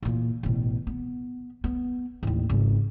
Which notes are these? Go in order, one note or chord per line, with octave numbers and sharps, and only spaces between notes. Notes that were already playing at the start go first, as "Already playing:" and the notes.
E2 A#2
A1 B2
B3
B3
A1 D#2
G#1 C#3